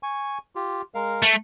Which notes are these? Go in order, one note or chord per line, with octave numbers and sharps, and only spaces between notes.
G#5 C#6
F4 G4
G#3 A#4 F5
A3